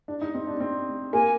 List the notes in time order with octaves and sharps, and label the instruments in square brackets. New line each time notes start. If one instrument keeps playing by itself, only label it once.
[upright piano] D4
D#4
C4
D4
C4
[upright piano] A#3 [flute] G#5